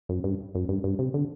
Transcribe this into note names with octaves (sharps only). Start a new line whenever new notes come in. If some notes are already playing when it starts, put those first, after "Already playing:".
F#2
G2
F#2
G2
G2
C3
D3